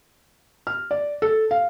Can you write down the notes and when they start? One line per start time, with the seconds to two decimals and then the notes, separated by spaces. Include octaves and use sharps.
0.67 F6
0.91 D5
1.22 A4
1.51 F5